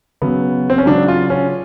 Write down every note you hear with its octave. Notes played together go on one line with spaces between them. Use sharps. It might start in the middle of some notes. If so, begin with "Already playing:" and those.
C#3 F#3 B3
C4
C#4
C#3 F#3 D4
F4
C#4